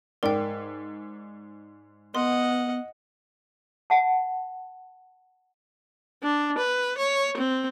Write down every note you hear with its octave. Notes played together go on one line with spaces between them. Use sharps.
G#2 A#4 D5 G5
B3 D#5 F#5 C6
F#5 A5
D4
B4
C#5
C4